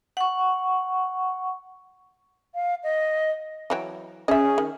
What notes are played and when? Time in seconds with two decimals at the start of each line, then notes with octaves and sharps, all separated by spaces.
0.17 F#5 C#6
2.54 F5
2.83 D#5
3.70 E3 F#3 G5
4.28 C#4 G#4 D#5 E5
4.58 D#3